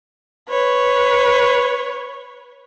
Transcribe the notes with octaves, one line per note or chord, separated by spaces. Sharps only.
B4 C#5